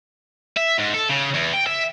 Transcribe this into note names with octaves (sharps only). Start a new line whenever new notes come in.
E5
G#2
A4
C#3
E2
G5
E5